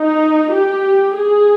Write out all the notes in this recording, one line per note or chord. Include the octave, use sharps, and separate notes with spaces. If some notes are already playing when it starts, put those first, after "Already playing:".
Already playing: D#4
G4
G#4